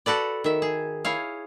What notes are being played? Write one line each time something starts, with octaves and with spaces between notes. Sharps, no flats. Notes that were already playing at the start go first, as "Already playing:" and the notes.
F#4 A4 B4 D5
D#3 E5
G#4
E4 G#4 C#5 F5